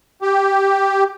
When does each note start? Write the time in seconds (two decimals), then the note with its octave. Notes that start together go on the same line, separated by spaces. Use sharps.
0.22 G4